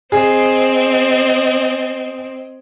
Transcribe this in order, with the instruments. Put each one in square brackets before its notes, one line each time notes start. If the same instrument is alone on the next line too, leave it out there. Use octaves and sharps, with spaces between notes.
[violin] C4 [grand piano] G#4 [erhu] D#5